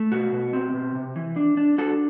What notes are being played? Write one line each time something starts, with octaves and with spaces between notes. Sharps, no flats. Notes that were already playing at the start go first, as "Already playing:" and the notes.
Already playing: A3
B2 F#4
B2
C4
B2
C3
E3
D4
D4
D4 F#4 A4